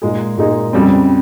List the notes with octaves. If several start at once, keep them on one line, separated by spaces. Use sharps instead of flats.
A#2 G#3 D#4 G#4
A#2 G#3 D#4 G#4
F2 C#3 G3 C4